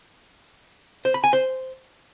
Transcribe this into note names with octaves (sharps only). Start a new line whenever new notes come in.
C5
B5
G#5
C5